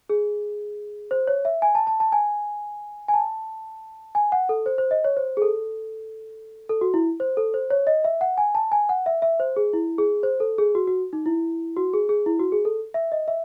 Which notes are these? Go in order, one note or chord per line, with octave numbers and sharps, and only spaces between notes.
G#4
C5
C#5
E5
G#5
A5
A5
A5
G#5
G#5
A5
G#5
F#5
A4
C5
C5
D#5
C#5
C5
G#4
A4
A4
F#4
E4
C5
A4
C5
C#5
D#5
E5
F#5
G#5
A5
G#5
F#5
E5
E5
C5
G#4
E4
G#4
C5
A4
G#4
F#4
F#4
D#4
E4
F#4
G#4
G#4
E4
F#4
G#4
A4
E5
D#5
E5